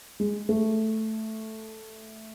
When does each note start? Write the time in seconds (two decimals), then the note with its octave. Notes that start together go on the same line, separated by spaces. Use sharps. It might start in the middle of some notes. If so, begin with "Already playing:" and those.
0.20 G#3
0.49 A3